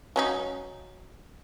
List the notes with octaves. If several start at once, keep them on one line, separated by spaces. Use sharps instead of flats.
F#3 C#4 D#4